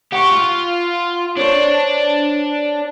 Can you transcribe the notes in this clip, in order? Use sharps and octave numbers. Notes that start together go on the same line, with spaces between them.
G4 F#5 C#6
F4
D4 C5 C#5